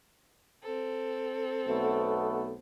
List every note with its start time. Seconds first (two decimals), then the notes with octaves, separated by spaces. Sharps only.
0.63 C4 A4
1.66 B1 A3 B3